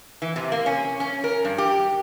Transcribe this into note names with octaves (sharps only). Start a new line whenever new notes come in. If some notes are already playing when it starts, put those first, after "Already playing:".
E3
C3
A#3
C#4
C#4
A#4
G2
G4